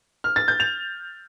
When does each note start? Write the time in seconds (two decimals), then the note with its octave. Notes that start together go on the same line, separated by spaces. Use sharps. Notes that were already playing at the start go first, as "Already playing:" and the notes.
0.24 F6
0.36 A6
0.48 G6
0.60 F7